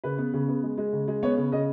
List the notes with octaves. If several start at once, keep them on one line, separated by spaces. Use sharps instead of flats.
C#3 B4
B3
C#3
B3
G#3
G#3
C#3
G#3
B3 C#5
C#3
C#3 D#5